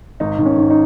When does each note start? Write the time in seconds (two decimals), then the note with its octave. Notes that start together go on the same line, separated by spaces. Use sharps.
0.20 G#1 D#4
0.38 D#3
0.46 C#4
0.58 G#1
0.70 D#4